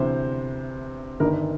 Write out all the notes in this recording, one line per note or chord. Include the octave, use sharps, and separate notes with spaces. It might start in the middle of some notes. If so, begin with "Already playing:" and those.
Already playing: D2 C3 E3 C5
G1 G2 D#3 A#4